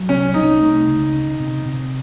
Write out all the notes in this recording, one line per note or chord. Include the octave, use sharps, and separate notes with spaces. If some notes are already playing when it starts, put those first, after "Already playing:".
Already playing: F#3
C2 C#4
C3 D#4
A3
C#2
C#3
C3
C3